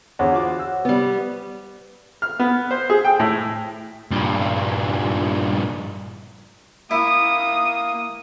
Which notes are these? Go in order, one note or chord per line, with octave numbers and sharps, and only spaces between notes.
E2 D3 C5 C#5 F#5
F4 F#4 D6
F#4 E6
G3 B3
F6
B3
C5
G#4
G5
A2
G2 A#2
A#3 E4 D#6